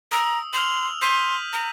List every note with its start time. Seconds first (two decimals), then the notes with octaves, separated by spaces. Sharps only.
0.12 A#5 D#6 E6
0.53 C6 F6 F7 F#7
1.02 C6 G6 B6 D#7
1.53 A#5